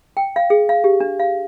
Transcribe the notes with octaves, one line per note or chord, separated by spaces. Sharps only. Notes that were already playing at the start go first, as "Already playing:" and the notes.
G5
F5
G#4
F5
G4
D4
F5